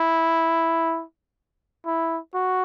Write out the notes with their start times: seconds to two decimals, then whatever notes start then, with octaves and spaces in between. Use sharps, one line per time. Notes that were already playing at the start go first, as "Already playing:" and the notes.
Already playing: E4
1.87 E4
2.34 F#4